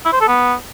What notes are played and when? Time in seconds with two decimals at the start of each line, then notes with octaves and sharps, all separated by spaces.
0.05 E4
0.13 C5
0.20 A4
0.28 B3